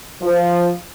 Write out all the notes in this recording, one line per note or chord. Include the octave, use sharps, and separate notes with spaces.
F3